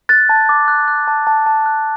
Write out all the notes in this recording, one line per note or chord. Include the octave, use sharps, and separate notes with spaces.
F#6 A6
A5
D6
F#6
F#6
A5
A5
A5
F#6